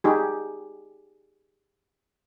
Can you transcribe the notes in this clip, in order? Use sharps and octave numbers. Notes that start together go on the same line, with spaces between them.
D#4 G4 G#4